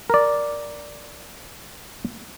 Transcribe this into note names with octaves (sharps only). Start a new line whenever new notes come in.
A#4 D5